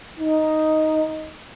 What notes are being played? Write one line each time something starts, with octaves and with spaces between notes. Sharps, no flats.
D#4